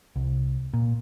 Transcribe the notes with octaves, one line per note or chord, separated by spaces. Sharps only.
C2
A#2